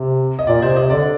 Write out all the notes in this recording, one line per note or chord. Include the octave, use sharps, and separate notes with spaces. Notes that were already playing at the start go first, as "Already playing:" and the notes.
Already playing: C3
D#5
A#2 D5
C3 C5
C3 D#5
D3 D5